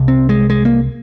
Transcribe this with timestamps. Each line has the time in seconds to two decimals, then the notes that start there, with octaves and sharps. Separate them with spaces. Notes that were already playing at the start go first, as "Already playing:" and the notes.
Already playing: C2 C3
0.08 C4
0.29 G#3
0.50 G#3
0.65 A#3